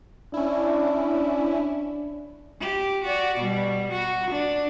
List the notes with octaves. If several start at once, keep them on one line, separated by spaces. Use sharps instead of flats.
C#4 D4 E4
G4
F#4 D5
B2 G3
F#4
D4